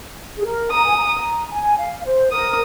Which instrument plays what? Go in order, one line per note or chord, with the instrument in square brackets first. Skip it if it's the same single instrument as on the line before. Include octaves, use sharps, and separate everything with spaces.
[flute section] G#4
A#4
[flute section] A#5 [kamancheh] D#6
[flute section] G#5
A#5
G#5
F5
C5
[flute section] A#4 [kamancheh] D#6